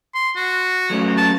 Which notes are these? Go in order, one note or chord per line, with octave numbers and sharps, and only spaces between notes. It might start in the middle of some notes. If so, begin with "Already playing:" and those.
C6
F#4
F#3 A3 C#4
A5